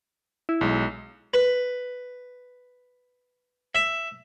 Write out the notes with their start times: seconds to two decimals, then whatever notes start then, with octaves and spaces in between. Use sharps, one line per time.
0.49 E4
0.61 B1 G#3
1.34 B4
3.75 E5